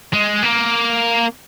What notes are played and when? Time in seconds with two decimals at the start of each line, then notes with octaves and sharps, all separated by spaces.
0.13 G#3
0.43 A#3